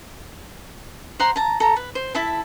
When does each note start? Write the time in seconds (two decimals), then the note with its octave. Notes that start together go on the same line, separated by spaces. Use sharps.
1.19 C5 F#5 A#5 C6
1.36 A5 A#5
1.60 A4 A#5
1.76 B4
1.95 C5
2.14 E4 A4 E5 A5